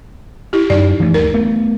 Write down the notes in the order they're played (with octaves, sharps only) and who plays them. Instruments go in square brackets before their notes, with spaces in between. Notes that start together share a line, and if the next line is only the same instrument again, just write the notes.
[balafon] E4 G4
[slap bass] F#2 [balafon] D#4 D5
[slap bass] E3 A3
[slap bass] D2 [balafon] A#4
[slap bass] A3 B3